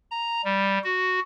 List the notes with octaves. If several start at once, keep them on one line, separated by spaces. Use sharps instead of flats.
A#5
G3
F#4